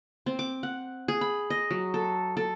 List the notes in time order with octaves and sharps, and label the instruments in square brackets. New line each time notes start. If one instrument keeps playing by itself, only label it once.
[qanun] C4
D6
F#5
G#4
B5
D#5
F#3
A4
A4